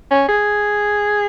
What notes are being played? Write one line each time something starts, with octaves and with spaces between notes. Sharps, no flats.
C#4
G#4